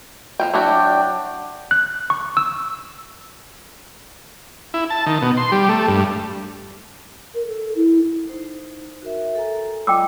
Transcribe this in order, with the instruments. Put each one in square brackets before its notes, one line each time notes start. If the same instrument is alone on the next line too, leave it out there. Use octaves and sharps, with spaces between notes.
[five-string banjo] F3 F4 G5
[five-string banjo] F#3 E4 F#4 [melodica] D4 D5 G5
[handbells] F#6
C#6
E6
[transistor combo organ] E4
A5
D#3
B2
C6
G3
A3
G2
[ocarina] A#4
A4
E4
[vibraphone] D#4 C5
F#4 A#4 E5
A4 G#5 A#5
[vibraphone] F4 D5 D#5 [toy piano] G5 D6 E6